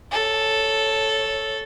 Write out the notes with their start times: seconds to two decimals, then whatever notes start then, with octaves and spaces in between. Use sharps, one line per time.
0.11 A4 C#5